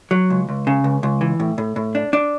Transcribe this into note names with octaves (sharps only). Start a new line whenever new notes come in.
F#3
C#2
C#2
C#3
C#2
C#2
E3
A2
A2
A2
D4
D4